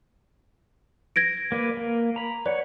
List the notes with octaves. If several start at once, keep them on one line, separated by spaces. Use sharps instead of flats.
G#6 A#6 D7
A#3 B4 D5
A#3
A#5 B5
B4 C#5 D5 F#5